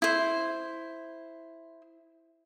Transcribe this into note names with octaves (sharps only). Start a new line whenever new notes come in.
E4 C5